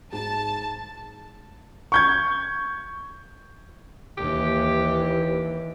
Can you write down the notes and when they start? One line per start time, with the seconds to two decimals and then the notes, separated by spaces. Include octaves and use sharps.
0.12 G#2 A5
1.92 C#6 G6 G#6
4.18 D#2 E3 G4